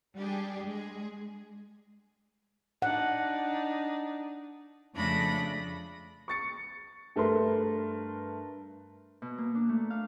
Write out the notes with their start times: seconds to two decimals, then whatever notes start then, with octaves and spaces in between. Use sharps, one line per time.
0.16 G3 D4 G4 G#4
0.66 G#3 G#4
2.82 D4 D#4 F#5
4.93 F2 C#3 A3 D4 B5 A#6
6.28 C#6 A6 C#7
7.16 G2 A3 A#4 B4 C6
9.22 B2
9.38 A#3
9.55 D4
9.69 A3
9.90 F5